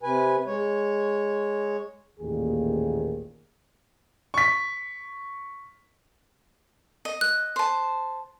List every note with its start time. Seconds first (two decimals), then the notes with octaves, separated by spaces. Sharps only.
0.03 C3 B4 G#5
0.47 G#3 C#5
2.20 A1 D#2 A#2 D#3 G#4
4.34 C#6 B6
7.05 D#5
7.21 F#6
7.56 C5 A5